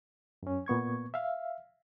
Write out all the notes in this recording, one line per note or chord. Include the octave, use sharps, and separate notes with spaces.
F#2 C#4
A#2 B3 C#6 G#6
E5 F5